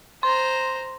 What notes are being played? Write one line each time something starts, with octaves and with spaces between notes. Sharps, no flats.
C5 A#5 C6